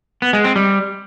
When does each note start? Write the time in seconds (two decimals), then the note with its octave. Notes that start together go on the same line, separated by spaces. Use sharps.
0.22 B3
0.33 G#3
0.44 C4
0.56 G3